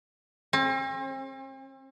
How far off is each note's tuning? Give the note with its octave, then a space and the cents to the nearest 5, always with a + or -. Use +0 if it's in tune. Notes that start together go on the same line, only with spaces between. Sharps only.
C4 +40